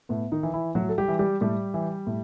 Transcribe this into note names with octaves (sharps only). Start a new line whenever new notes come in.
A2 B3
D#3 D#4
E3
E3 E4
A2 F#3 F#4
A4
G3 G4
E3
G3 G4
A2 G3 G4
E3
A2